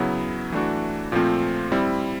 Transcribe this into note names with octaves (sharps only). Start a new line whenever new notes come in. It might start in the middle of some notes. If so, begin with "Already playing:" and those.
Already playing: C#3 F#3 B3 E4
E3 A3 D4 F#4
A#2 F3 A3 C4 F4
G3 C4 E4